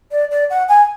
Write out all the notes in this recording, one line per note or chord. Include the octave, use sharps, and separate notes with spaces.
D5
D5
F#5
G#5